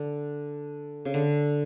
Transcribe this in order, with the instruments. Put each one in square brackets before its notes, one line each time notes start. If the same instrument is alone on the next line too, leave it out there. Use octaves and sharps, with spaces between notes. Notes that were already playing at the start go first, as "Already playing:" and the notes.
Already playing: [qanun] D3
C#3
D3